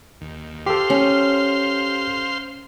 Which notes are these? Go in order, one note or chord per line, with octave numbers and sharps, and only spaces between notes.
D#2
G4 A4 C5 F5 C6
C#4